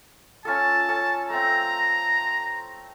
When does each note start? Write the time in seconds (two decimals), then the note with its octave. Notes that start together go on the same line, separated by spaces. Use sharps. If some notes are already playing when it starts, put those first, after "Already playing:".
0.45 C#4 F4 A4 A5
0.89 C#4 A4
1.30 A3 C4 A#5